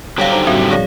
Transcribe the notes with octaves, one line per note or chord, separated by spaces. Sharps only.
D3 F#3 G3 G4 C#5 F5
D#4 C5 A#5
A2 G3 C4 F#4 E5
F3 G#4 C#5 D5 F5 A#6